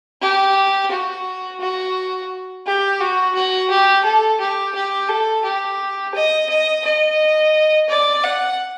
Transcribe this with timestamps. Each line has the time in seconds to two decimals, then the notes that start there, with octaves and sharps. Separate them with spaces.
0.22 G4
0.90 F#4
1.60 F#4
2.66 G4
3.00 F#4
3.34 F#4
3.70 G4
4.05 A4
4.40 G4
4.74 G4
5.09 A4
5.44 G4
6.14 D#5
6.49 D#5
6.84 D#5
7.89 D5
8.23 F#5